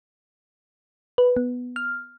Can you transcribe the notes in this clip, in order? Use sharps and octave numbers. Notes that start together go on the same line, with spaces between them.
B4
B3
F6